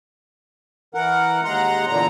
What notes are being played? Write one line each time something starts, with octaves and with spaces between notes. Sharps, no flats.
E3 A#4 F#5
D#2 G#3 F#5 A#5 C6
E2 A#2 D3 A#5